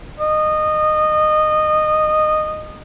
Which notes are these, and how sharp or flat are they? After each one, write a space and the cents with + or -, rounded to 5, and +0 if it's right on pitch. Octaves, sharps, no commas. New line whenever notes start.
D#5 -20